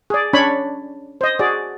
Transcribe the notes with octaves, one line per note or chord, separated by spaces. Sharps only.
G#4 D5
C#4 D4 C#5 D5 B5
C5 D#5
F#4 G#4 D5